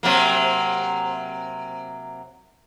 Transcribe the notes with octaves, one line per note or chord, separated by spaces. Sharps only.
C3 F#3 A#3